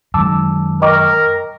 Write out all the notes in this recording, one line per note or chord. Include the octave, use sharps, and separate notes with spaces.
F#2 D#3 G#3 A5 D6 E6
A#4 D#5 G5 C#6 D6